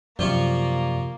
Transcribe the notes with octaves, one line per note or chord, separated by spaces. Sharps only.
F#2 C3 F3 A#3 F4 G4 D5 C#6